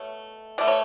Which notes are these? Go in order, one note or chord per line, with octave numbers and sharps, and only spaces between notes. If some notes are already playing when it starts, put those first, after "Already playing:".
Already playing: B2 A3 C#5
B2 A3 D5
C#5